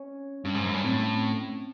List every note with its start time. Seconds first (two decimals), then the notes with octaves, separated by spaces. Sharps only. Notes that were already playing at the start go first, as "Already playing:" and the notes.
Already playing: C#4
0.45 G2 C#4
0.55 G#2
0.64 F#2
0.73 G2
0.84 A2 C4